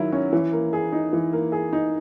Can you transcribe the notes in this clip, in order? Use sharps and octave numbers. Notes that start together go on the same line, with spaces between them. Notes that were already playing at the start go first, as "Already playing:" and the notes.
Already playing: D#3 F#3 E4
C#4
E3
A#3
G#4
D#4
E3
A#3
G#4
D#4